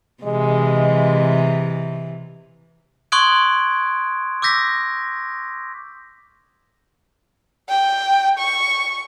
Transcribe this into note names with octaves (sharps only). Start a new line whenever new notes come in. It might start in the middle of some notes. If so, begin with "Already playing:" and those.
C3 E3 G#3
C6 C#6 D#6 F#6 G#6 D7
D6 E6 G6 A#6 B6
G5
C#6